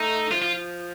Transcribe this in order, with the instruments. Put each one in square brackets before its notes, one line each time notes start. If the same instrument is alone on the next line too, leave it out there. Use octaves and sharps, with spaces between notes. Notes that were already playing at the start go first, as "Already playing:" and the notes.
Already playing: [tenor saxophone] A3 [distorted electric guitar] D#4
[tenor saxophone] F3 [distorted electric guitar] F4
[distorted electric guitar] F4